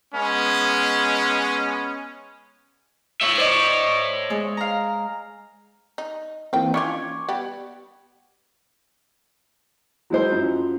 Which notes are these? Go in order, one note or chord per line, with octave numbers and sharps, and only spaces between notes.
G#3 B3 C#4
C#5 E5
C5 D5 D#5
G#3
F5 A#5
D#4
E3 A#3 C4 F5 G5
C#4 D#4 F4 C#6 D6 G#6
G3 B3 G4
F#3 G#3 E4 C5
F#2 F3